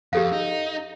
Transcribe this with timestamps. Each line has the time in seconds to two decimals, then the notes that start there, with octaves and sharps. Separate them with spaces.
0.13 F2 G4 A4 F5
0.33 D#4